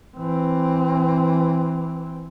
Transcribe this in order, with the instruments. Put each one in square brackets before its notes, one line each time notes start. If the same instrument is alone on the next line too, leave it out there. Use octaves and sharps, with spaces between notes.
[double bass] E3 C4